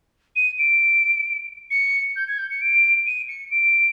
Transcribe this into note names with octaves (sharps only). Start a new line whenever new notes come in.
D#7
D7
C#7
G6
G#6
G6
C#7
D7
D#7
C#7
D7